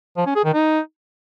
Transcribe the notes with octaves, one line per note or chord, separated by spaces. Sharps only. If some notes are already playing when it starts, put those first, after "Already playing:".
F3
C#4
G#4
D#3
D#4